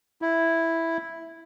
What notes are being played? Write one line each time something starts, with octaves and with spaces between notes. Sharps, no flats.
E4